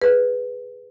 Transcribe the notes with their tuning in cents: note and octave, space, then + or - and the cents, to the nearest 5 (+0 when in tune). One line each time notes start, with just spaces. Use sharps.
G#4 +0 B4 +0